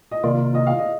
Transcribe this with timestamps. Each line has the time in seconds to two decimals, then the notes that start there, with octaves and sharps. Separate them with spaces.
0.11 D#5
0.23 C3 D#3 A#3 F4 D5
0.55 D#5
0.67 F5
0.79 D#5